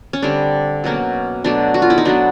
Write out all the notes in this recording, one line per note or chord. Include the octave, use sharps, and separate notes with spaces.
C#4
D3 G3 C4 D4
B2 F#3 A#3 C#4
B2 F#3 A3 D4
F#4
F4
E4
D#4
B2 F#3 B3 D4